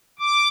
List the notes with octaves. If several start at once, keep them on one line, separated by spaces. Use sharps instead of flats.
D6